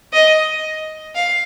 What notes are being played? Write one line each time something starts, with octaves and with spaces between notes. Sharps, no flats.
D#5
F5